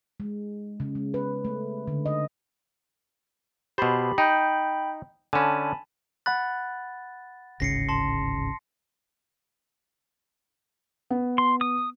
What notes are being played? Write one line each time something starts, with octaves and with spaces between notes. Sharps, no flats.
G#3
C#3
G#3
B4
A3
D3
D#5
B2 G4 C5 B5
D#4 G5 B5 G6
D3 C#4 G#5 A5 B5
F#5 B5 F#6 A6
D1 G#1 C#3 A#6 C7 C#7
A5 C6
B3
C6
D#6